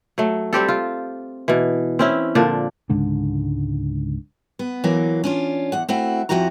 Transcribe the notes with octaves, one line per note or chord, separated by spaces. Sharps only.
F#3 A3
G3 C4 G4 A4
F4
B2 E3
C4 C#4 E4
A#2 D3 F3 D4
C#2 G#2 D3
B3
E3 F#3 A#3
C#4 D4 F4
E2 F#5
A3 C4 E4 F#4
F2 C#3 F3 E4 F#4 A#5